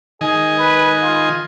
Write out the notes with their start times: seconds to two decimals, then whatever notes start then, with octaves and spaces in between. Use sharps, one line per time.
0.21 D#3 G#4 D#5 G#5
0.57 B4
1.01 F4